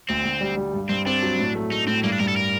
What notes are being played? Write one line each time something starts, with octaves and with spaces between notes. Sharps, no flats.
D2 C4
D2
G3
G3
G2
G2 C4
C4 D4
F#3
A2
A3
A3 D#4
A2 C4
G2 A#3
D4
G2 A#4
A4
A#4